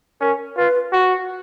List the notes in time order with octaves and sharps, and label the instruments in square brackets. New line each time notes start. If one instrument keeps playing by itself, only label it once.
[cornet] C#4 [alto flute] A#4
[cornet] F4 [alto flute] B4
[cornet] F#4